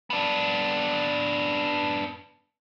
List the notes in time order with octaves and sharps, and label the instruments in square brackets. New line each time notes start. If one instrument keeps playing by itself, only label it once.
[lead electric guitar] B3 D4